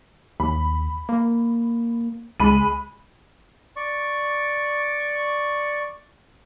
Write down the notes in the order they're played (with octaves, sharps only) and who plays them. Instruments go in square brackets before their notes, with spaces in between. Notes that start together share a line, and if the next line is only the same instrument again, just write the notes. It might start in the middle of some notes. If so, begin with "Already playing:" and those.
[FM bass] D#2 [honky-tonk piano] B5
[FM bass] A#3
[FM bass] C#2 [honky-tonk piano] G#3 B5 D#7
[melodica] D5 C#6